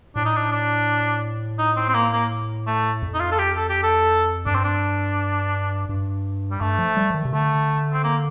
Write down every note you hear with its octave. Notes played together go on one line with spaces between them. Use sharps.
A2 D4
D#4
D4
D4
D#4
C4
C4
A#3
A#3
A3
F2
D#4
F4
A4
G4
A4
G4
A4
G2 D4
C4
D4
G2
G3
G2 A3
F3
G3
F3
D#3
C3
D3 A3
C4
A#3